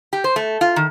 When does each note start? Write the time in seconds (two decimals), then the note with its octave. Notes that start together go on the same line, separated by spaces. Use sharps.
0.13 G4
0.24 C5
0.36 A3
0.61 F4
0.76 D#3